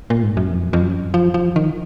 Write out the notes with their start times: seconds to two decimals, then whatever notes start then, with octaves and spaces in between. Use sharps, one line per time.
0.10 A#2
0.23 G#2
0.37 F#2
0.50 F2
0.73 F2
0.82 F#2
1.14 F3
1.34 F3
1.56 D#3